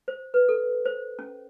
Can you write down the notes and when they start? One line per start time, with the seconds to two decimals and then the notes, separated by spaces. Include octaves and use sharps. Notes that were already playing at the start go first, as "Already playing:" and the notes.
0.08 C5
0.34 B4
0.49 A4
0.85 C5
1.19 C#4